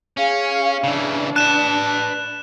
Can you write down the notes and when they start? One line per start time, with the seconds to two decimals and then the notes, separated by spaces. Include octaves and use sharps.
0.17 C#4 G#4 F5
0.84 C#3 E3 D4
1.36 B4 A5 F#6 E7